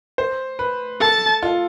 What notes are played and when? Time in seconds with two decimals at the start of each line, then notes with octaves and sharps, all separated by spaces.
0.18 C5
0.59 B4
1.00 A4 A5
1.43 F4